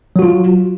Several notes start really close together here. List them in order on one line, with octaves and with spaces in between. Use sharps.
F#3 F#4 F4